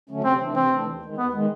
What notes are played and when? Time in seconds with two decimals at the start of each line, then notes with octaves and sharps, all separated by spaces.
0.10 D3 F#3 A3 C#4
0.24 C3 C4
0.39 E3 A3 D4
0.55 C3 C4
0.71 E3 A3 D4
0.87 D#2
1.02 D#3 G#3
1.17 D#2 B3
1.33 D#3 G#3